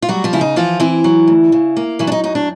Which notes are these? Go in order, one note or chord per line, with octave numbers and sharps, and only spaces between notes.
F4
F#3 G3 F#4
F3 F4
C#3 E4
D#4
E3 F3 F4
E3 C4 E4
F#3
D2
C#3
A#3
E3 F#3 E4
D4
D#4
F#2 D#4
D4